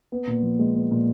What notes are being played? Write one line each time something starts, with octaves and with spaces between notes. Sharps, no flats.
B3
A#2
F3
G#3
B3
A#2